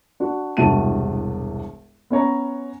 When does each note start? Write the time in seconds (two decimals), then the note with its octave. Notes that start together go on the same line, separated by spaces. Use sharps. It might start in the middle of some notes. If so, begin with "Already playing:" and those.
0.20 D4 F#4
0.57 E1 C2 G2 F#4 A5 D#7
2.10 B3 C#4 C#5 A#5